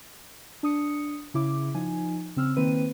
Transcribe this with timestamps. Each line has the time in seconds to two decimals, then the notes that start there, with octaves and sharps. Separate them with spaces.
0.63 D4 D#6 C#7
1.34 C#3 E4 D6
1.74 F3 D#4 G#5
2.36 C#3 C4 E6 F6
2.56 D#3 A#3 C4 B4 D#7